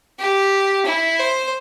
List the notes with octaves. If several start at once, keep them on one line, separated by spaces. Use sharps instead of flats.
G4
E4
C5